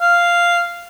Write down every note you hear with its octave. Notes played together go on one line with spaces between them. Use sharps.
F5